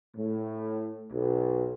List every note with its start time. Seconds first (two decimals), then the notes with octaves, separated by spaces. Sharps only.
0.16 A2
1.12 B1